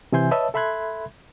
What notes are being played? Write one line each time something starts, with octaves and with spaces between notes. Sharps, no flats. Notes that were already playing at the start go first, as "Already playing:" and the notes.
C3 E3 E5 G#5 C6 G6
B4 C#5 D#5 E5 A5 E6
A4 E5 B5 C6 F#6 G#6